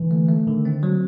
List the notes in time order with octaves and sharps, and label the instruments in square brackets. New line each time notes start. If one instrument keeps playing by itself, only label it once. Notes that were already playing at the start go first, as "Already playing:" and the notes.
Already playing: [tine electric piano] D3 [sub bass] E3
[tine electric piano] A3
A3
[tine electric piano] D3 [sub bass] D#3
[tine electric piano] C4
F#3